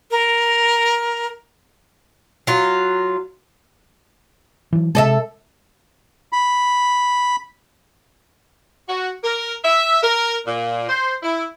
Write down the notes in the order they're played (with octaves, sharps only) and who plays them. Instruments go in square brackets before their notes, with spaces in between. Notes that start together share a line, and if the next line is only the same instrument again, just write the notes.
[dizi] A#4
[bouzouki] F#3 F4
[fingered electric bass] E3 F#3
[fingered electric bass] C3 G#3 [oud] A4 D#5 E5
[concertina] B5
[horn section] F#4
A#4
E5
A#4
A#2
C5
E4